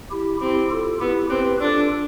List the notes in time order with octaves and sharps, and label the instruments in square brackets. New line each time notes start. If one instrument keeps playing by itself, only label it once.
[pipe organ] E4 G4
[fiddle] C4 [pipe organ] E4 G4
[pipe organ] F4 A4
[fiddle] B3 [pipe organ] E4 G4
[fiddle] C4 [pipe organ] G4 B4
[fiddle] D4 [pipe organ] F4 A4